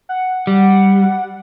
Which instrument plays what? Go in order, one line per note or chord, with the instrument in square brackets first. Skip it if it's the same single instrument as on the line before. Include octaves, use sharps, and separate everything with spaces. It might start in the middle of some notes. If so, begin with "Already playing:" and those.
[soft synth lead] F#5
[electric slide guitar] G3